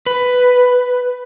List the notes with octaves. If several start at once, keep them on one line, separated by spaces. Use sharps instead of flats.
B4